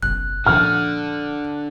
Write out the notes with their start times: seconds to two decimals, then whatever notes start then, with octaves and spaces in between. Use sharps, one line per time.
0.03 F#1 B1 F#6
0.46 A#2 D3 F3 F6